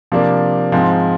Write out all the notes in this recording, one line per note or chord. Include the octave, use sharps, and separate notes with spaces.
C3 F3 A#3 D4
G#2 F3 G#3 C4